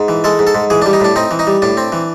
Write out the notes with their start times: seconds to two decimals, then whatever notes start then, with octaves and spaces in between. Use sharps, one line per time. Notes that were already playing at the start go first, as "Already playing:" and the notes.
Already playing: G#2
0.08 E3
0.24 G#3 A4
0.39 G#2
0.47 A4
0.55 G#2
0.70 E3 G#4
0.82 D4
0.86 G3
0.93 D#4
1.00 A2 D4
1.16 C4 D#4
1.31 E3
1.39 D#4
1.47 G3
1.62 A2 D4
1.77 C4
1.92 E3